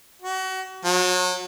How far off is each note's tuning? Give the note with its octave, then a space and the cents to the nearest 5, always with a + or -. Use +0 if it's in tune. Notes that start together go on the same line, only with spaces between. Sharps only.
F#4 +30
F#3 -30